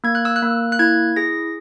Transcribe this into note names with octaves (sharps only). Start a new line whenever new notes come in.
A#3 G#6
F#6
E6
F#6
A#3
F#6
E4 G#6
G#4 A#6